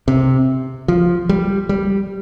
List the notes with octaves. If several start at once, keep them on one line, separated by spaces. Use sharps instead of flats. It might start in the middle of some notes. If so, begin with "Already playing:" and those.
C3
F3
G3
G3